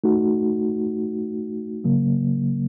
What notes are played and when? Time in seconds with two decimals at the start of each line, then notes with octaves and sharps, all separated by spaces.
0.04 A3 D#4 F#4
1.84 C#3 F#3 A#3